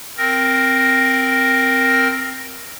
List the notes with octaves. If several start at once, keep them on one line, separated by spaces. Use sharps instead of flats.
C4 A#4 A#6